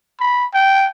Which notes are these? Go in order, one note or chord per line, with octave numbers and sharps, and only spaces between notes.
B5
G5